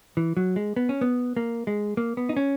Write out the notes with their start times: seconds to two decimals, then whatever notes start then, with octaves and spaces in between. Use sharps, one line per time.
0.17 E3
0.37 F#3
0.56 G#3
0.76 B3
0.89 C#4
1.01 B3
1.37 A#3
1.67 G#3
1.97 A#3
2.17 B3
2.29 D#4
2.37 C#4